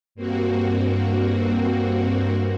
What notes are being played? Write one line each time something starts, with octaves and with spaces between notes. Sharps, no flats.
G2 A#3 C4 F#4